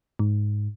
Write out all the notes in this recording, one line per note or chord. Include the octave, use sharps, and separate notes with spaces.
G#2